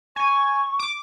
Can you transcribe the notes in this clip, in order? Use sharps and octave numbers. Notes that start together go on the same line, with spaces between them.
G#5 C#6
D6